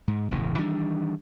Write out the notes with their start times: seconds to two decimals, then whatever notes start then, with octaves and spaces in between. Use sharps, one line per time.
0.08 G#2
0.31 E1 A1 C#3 E3
0.58 D#3 E3 G3 D4